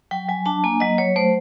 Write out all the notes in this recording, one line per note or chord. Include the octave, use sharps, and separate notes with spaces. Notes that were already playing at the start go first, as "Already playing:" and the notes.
F#3 G5
F#3 G#5
D4 A5
A#3 G#5
F#3 D#5
F#3 C#5
A3 C5